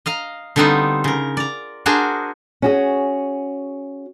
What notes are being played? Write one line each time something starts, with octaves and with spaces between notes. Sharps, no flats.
D#5 F5 A#5
D3 G3 B3 C4 D#4 F4
C#3 A#4
D5 A#5
D4 F#4 G#4 A#4 C5
C#4 F#4 G#4